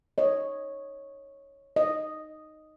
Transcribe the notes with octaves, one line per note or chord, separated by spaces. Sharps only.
C#5 D#5
D#5